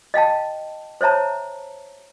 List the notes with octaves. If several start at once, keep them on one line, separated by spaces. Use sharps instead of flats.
D#5 F5 G5 A5
C5 C#5 E5 A5 A#5